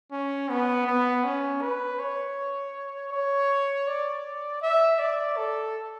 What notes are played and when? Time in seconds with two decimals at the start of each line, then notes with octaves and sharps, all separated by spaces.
0.12 C#4
0.50 B3
0.87 B3
1.24 C#4
1.61 B4
1.99 C#5
3.12 C#5
3.87 D5
4.62 E5
4.99 D5
5.37 A4